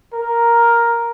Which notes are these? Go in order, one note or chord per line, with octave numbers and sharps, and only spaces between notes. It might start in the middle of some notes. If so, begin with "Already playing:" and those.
A#4